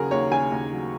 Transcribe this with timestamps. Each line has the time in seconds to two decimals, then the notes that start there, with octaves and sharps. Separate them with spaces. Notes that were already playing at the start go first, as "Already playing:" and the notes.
Already playing: D#2 C#3 F#3 G#4 A#4
0.11 D#2 C#5
0.31 C#3 G#5
0.52 D#2
0.72 F#3